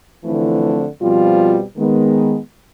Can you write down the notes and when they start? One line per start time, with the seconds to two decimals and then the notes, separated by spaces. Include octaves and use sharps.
0.24 D3 E3 F3 A3 C4 E4
1.00 B2 F3 G3 C4 F4
1.76 D#3 G#3 B3